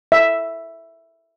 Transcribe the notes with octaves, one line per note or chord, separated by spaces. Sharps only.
E5